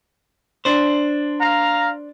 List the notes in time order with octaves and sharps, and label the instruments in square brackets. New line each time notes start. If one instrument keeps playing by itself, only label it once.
[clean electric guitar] D4 C5
[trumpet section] F5 A#5